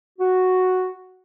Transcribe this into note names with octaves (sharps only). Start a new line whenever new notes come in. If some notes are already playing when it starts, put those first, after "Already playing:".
F#4